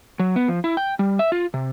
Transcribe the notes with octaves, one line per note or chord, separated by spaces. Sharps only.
F#3
B3
F3
E4
G5
G3
E5
F4
C3